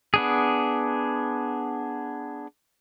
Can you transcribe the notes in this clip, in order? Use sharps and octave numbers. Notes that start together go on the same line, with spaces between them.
B3 D4 G#4